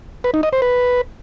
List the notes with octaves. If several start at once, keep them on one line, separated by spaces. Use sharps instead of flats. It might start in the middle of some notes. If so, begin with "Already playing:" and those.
B4
D#4
D#5
C5
B4